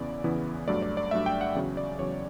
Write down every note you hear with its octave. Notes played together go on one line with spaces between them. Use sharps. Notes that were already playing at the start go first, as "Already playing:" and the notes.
Already playing: E2 C#3 E3 B3 E4 D5
E2 C#3 E3 B3 E4
G2 F#3 A3 D5
D5
D5
G2 F#3 A3 E5
G5
F#5
E2 C#3 F#3
D5
E2 C#3 F#3 C#5